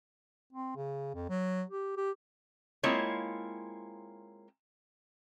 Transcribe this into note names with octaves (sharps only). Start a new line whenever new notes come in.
C4
C#3
F2
F#3
G4
G4
G#3 A#3 C4 E4 F4 C#5